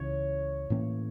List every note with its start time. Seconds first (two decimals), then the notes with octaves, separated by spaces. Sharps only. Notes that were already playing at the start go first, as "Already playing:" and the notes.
Already playing: C#2 C#3 E3 C#5
0.70 A2 E3 A#3 C#4